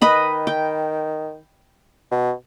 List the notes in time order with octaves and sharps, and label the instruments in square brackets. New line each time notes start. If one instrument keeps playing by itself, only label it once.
[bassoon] D#3 [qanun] B4 D#5 B5
[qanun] G5
[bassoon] B2